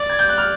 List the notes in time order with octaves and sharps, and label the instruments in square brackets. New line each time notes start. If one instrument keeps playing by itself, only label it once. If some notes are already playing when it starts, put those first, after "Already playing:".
Already playing: [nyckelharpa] D5
[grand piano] G#6
G6
F#6
F6